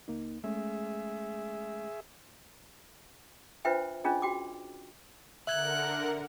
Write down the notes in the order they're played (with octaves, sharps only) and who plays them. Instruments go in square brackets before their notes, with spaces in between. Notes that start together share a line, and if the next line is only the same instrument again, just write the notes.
[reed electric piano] C#2 A#3 D#4
[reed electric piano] G#3 A3 C#4 [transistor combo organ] G#4 E5
[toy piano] D4 F4 B4 C5 E5 G5
C#4 D4 F4 G#4 D#5
F#4 G5 D6
[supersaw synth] D3 A#4 F#5 [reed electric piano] E5 G#6 [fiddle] F#6